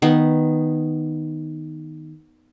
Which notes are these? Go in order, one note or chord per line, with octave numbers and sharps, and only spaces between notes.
D#3 B3